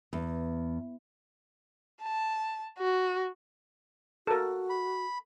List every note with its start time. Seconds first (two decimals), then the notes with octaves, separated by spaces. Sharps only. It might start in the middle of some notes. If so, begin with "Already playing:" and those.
0.13 E2
2.02 A5
2.79 F#4
4.27 F#4 A4 A#4
4.70 B5